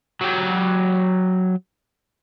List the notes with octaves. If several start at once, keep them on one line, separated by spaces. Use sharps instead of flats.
F#3 G4